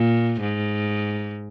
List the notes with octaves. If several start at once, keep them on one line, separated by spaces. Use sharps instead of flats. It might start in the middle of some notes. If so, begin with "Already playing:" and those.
Already playing: A#2
G#2